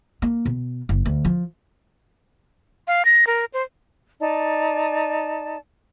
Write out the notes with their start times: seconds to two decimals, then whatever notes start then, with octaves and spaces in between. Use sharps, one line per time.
0.22 A#3
0.46 B2
0.89 F#1
1.06 D2
1.25 F3
2.88 F5
3.05 A#6
3.27 A#4
3.54 C5
4.20 D#4 D5 A5